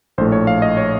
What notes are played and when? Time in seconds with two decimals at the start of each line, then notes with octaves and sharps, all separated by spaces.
0.18 A#1 A2 A3 C5
0.32 C#5
0.47 F5
0.62 D#5
0.77 C#5